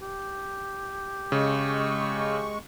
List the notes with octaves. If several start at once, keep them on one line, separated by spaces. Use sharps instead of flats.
G4
C#3 G#3 C#6